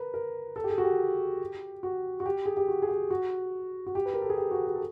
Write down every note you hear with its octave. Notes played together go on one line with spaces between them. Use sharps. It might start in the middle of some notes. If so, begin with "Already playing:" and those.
Already playing: A#4 B4
A#4
A4
G4
G#4
F#4
G4
F#4
F#4
G4
G#4
G4
F#4
G#4
G4
F#4
F#4
G4
B4
A#4
A4
G#4
G4
F#4
G4
A4